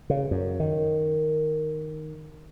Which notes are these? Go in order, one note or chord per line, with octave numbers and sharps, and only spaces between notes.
C#3
F#2
D#3